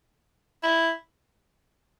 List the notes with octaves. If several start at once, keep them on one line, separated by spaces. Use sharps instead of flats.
E4